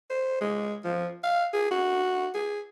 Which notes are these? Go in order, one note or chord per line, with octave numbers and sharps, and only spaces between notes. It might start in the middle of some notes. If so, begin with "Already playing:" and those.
C5
G#3
F3
F5
G#4
F#4
G#4